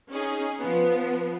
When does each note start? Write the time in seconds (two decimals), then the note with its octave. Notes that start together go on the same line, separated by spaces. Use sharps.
0.10 C#4 D#4 G#4
0.60 F3 B3